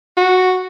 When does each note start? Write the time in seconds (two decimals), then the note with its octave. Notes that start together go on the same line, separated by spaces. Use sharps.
0.17 F#4